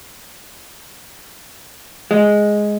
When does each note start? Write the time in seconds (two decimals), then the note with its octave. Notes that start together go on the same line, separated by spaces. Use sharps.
2.11 G#3